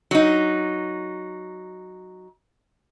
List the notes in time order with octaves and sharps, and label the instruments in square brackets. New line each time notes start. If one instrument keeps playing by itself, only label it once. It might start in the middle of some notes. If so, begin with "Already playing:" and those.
[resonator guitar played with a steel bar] F#3 D#4